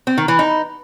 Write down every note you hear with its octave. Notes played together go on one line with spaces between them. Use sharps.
C4
D#3
E3
D#4